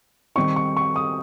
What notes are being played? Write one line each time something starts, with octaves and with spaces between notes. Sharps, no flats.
D#3 G3 C4 D#4 C#6
C#6
C#6
D#6